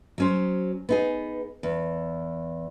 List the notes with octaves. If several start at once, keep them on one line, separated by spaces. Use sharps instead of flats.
F#3 C#4 C5
B3 D#4 G#4
E2